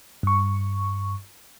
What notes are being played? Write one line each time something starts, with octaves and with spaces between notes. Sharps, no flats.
G2 C#6